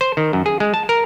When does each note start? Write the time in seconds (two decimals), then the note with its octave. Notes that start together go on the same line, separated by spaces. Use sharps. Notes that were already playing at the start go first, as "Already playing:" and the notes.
0.01 C5
0.17 D#3
0.33 F#2
0.46 G#4
0.60 G#3
0.74 A5
0.89 A#4